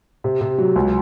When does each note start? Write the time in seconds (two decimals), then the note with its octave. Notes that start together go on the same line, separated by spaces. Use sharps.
0.24 C3
0.41 C3
0.58 F#3
0.76 C#2